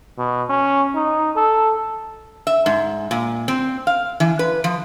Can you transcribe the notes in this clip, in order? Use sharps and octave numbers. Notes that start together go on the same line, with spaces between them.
B2
C#4
D#4
A4
E5
G#2
A#2
C4
F5
E3
B4
F3